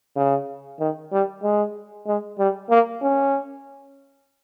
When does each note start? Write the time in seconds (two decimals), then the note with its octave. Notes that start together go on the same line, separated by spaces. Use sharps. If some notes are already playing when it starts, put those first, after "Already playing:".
0.16 C#3
0.79 D#3
1.12 G3
1.43 G#3
2.06 G#3
2.38 G3
2.70 A#3
3.02 C#4